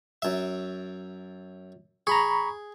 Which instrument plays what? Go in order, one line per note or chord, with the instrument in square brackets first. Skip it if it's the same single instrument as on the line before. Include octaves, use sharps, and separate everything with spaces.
[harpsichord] F#2 E5
[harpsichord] G#4 [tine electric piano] A#5 B5 C#6